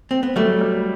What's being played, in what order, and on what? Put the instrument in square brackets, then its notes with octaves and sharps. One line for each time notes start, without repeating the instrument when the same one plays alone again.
[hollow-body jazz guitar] C4
B3
[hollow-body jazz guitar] F#3 A3 [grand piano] G3
[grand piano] G3